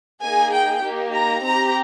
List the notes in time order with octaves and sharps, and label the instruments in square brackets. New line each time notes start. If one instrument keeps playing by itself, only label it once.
[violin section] A#3 D#4 G#4 G#5
G5
A#3 D#4 G4
A#5
C4 G4 A#5